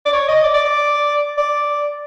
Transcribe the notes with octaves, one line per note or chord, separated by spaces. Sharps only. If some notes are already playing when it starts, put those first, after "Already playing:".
D5
C#5
D#5
D5
D5
D5
D5